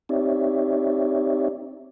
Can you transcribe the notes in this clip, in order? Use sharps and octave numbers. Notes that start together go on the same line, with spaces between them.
C4 D#4 G4 C#5 D5 E5